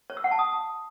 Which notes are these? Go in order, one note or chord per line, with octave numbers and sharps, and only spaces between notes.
C#5
E6
F#5
A5
D#6